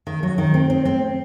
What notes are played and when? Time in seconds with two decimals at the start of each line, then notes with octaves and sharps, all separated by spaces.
0.07 D#3
0.23 F#3
0.38 D#3
0.54 C4
0.70 C4
0.85 C4